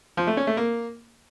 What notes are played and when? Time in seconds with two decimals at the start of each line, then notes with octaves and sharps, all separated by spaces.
0.17 F3
0.27 A3
0.37 C#4
0.47 A3
0.57 A#3